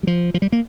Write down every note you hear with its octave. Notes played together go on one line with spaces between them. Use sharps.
G3
F3
F3
G3
A#3